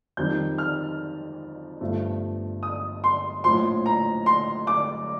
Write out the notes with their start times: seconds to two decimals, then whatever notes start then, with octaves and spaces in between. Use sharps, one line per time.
0.17 F2 D#3 G3 G6
0.58 F6
1.81 G1 G2 F3 A3
2.63 D#6
3.04 C6
3.44 A#1 A2 F3 C6
3.86 A#5
4.26 C6
4.67 D6